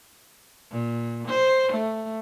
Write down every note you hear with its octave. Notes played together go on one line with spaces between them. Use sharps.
A#2
C5
A3